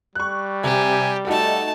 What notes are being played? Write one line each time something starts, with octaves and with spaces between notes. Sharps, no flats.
G3 C#6 F#6
C3 G4 G#5
A3 D#4 F#4 A4 A5